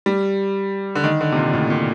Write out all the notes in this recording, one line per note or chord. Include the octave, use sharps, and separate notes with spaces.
G3
D3
D#3
D3
C3
A#2
A2
A#2